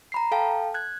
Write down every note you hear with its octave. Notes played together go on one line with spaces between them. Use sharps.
A#5 B5 C7
A4 F5 G5 A5
F#6 G#6